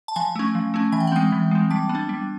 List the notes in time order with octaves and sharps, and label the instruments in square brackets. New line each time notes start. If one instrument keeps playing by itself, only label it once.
[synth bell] A5
F3 G#5
A3 C#4
F3
A3 C#4
E3 G#5
G5
F#5
G#3 C4 G5
E3
G#3 C4
G3 A5
B3
D4
G3